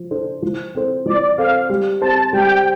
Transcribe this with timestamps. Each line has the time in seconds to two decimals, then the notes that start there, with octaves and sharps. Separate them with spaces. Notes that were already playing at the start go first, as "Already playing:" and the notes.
Already playing: F3
0.11 D4 A4 C5
0.42 F3
0.75 C4 A4 C5
1.06 F3 D5
1.38 C4 A4 C5 F5
1.69 G3
2.01 C4 G4 C5 A5
2.33 G3 G5